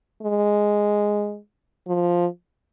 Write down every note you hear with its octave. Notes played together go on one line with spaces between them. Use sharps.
G#3
F3